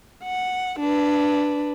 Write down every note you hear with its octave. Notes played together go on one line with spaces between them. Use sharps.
F#5
D4 B4